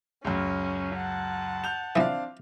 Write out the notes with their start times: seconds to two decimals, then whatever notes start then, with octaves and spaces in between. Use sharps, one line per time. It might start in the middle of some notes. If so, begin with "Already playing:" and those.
0.25 C#2 F#2 C#4
0.96 F#5 A5
1.64 G6 F7
1.96 E3 F3 C4 D4 F5